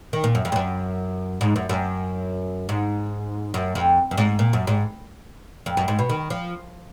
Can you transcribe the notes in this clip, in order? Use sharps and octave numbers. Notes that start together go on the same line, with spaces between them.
D#3
A#2
F#2
F2
G#2
F#2
G#2
F#2
F#2
G#2
F#2
F2
F#2
G#2
A#2
F#2
G#2
F2
F#2
G#2
B2
D#3
F3